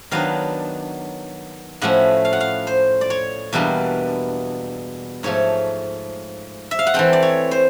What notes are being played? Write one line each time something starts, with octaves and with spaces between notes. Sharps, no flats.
D#3 F#3 B3 D4 F5
A2 F3 A3 C#4 F#5
F5
F#5
F5
C5
D5
C#5
E2 B2 G3 A#3 D4
G#2 F3 A3 C#5
E5
F5
F#5
E3 A3 C4 G5
D5
C#5
C5